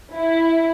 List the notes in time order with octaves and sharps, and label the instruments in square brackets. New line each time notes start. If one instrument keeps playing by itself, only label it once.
[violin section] E4